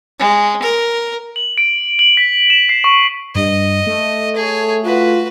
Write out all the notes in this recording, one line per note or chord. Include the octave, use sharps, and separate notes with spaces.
G#3
A#4
F#7
D7
F#7
B6
E7
C7
C#6
G2 D#5
A3
G#4 A4 C#5
F4 F#4 B4